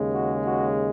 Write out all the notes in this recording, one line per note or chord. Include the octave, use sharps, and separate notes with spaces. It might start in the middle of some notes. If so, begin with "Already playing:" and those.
Already playing: D#2 C#3 G#3
F#4
F#4